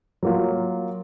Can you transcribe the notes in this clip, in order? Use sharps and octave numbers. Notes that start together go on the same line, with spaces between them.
F#3 A#3 F4